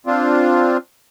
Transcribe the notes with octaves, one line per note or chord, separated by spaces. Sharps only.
C4 D4 F4